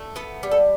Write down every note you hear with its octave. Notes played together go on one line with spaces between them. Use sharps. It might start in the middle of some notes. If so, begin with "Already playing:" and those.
Already playing: A3
B3 A4
G3
A4